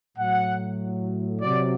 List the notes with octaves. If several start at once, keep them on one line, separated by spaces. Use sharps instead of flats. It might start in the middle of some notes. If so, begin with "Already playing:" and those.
A2 F#3 F#5
C3 F#3 D5